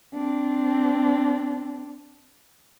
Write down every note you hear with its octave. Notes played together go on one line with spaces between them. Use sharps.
C4 D4